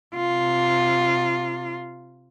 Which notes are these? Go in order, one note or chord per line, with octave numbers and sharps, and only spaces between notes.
C3 F4